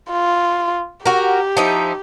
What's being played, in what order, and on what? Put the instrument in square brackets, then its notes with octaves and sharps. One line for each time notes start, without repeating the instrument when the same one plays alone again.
[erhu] F4
[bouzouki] F#4 A#4 [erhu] G4
[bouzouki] F3 D#4 E4